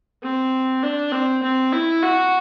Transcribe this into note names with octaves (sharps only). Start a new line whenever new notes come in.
C4
D4
C4
C4
E4
F#4